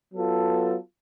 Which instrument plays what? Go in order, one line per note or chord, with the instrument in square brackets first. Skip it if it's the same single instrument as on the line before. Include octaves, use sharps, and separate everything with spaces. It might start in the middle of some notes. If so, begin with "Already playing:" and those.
[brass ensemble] F#3 B3 F4 A4